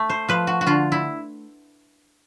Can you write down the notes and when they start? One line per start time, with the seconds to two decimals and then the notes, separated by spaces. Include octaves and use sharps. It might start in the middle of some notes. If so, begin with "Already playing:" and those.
Already playing: A3
0.09 C5
0.29 F3 B4
0.47 F#4
0.61 F#4
0.67 D3 F4
0.92 E4